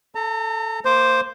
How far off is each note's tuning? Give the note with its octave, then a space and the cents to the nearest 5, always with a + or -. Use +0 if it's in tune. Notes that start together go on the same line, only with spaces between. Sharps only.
A4 +0 A#5 -40
A#3 -20 C5 +0 D6 +0